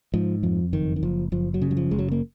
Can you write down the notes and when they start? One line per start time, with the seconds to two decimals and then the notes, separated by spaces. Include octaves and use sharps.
0.14 G#2 F3
0.43 F2 F3
0.73 F#1 D#3
0.96 D#3
1.03 F#1 F3
1.32 F#1 F3
1.54 F#3
1.62 C#3
1.71 F#3
1.77 F3
1.91 F#1 G#3
1.99 F#3
2.12 A#3